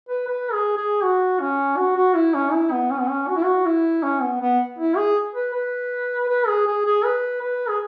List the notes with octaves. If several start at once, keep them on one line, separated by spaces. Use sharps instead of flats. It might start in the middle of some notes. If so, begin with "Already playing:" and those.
B4
B4
G#4
G#4
F#4
C#4
F#4
F#4
E4
C#4
E4
B3
C#4
B3
C#4
F#4
E4
F#4
E4
C#4
B3
B3
E4
G#4
B4
B4
B4
G#4
G#4
G#4
B4
B4
G#4